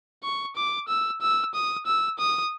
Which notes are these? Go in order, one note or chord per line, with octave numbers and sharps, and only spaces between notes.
C#6
D6
E6
E6
D#6
E6
D#6